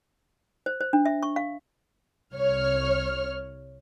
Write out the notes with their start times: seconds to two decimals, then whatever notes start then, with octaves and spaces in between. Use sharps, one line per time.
0.66 C5
0.81 C5
0.93 D4
1.06 E5
1.23 C#6
1.36 F5
2.33 C2 C#5 F6